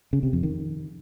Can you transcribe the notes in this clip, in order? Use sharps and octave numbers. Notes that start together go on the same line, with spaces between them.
C#3
C3
F2
D#3